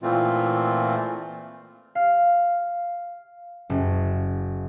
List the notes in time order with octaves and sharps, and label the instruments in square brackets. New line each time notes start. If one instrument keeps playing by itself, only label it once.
[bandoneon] A#2 E3 A3 C4 F4
[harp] F5
F#1